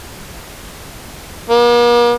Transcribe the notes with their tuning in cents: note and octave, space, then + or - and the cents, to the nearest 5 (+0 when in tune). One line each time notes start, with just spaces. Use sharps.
A#3 +45